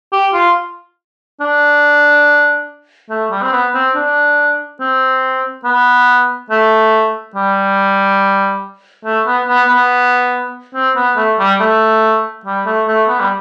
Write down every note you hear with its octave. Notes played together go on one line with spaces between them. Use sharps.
G4
F4
D4
A3
G3
C4
B3
C4
D4
C4
B3
A3
G3
A3
B3
B3
B3
C4
B3
A3
G3
A3
G3
A3
A3
B3
G3